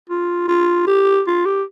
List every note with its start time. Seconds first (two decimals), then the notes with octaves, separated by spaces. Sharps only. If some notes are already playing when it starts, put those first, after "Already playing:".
0.09 F4
0.48 F4
0.87 G4
1.27 F4
1.45 G4